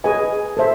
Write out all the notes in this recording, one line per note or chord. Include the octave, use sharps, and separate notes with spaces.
G#4 B4 D#5 G#5
A4 C5 E5